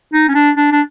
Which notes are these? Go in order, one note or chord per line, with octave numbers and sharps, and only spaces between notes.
D#4
C#4
D4
D4
D4